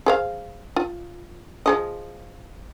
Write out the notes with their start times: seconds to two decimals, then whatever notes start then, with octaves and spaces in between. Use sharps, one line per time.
0.06 G#4 C5 F5
0.76 F4
1.66 F3 G#4 D#5